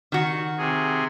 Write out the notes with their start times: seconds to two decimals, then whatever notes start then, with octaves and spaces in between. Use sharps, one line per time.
0.12 D#3 F#4
0.58 C3 G#4